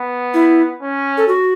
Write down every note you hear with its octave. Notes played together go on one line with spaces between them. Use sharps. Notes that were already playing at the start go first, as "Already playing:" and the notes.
Already playing: B3
E4
C#4
A4
F#4